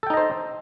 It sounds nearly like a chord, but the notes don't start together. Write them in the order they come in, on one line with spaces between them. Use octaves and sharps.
A4 G5 D#4 D#5 C5